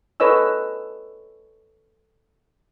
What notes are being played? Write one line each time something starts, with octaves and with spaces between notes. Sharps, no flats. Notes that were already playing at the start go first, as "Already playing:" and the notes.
A4 B4 C#5 D#5 G#5 E6